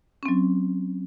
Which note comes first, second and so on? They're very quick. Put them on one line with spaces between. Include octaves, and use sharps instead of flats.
C#4 C4 F#3